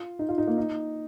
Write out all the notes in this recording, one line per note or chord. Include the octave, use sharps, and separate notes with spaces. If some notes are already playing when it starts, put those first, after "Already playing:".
Already playing: F4
D#4
F4
D#4
A#3
D#4